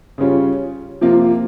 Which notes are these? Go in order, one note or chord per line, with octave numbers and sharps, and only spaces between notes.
C#3 G3 C#4 F4
C3 F3 A#3 F4